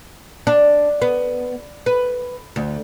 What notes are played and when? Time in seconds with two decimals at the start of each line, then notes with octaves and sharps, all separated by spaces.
0.47 D4
1.02 B3
1.86 B4
2.56 D2